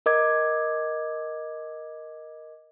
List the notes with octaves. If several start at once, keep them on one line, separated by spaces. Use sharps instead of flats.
A#4 D#5 D6 G#6